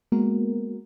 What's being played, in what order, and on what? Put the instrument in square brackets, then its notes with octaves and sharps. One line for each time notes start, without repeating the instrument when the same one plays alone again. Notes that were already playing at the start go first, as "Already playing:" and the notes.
[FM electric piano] G#3 A#3 B3 F#4 A#4